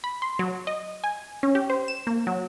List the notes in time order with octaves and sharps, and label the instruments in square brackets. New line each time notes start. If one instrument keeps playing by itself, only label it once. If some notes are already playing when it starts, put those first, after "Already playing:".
[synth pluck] B5
C6
F#3
D#5
G#5
C#4
G4
C5
E7
A#3
F#3